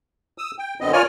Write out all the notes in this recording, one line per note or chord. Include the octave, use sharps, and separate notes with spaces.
D#6 E6
G5
F#2 D3 B3 C4 D#5
F4 A#4 C#5 D5 G#5 F6